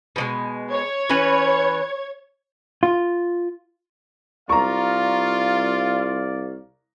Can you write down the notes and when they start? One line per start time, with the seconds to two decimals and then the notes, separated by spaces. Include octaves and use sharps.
0.16 B2 F3 G#3
0.70 C#5 G#6
1.09 E3 C#4 B4
2.83 F4
4.49 C2 F4 D5 F5 A#5 C#6